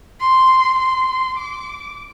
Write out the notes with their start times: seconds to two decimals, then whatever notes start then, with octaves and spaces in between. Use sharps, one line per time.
0.21 C6
0.79 C6
1.37 D6